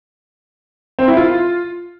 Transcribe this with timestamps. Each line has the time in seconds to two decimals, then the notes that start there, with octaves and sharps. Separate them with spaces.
0.99 C4
1.08 E4
1.17 F4